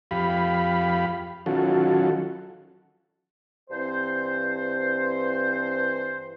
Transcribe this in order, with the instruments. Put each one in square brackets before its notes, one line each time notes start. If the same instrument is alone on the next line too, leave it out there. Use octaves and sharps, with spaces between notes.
[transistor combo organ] F2 G4 F5 B5
D#3 F#3 C#4 F4 F#4 A4
[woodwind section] G2 E3 C4 C5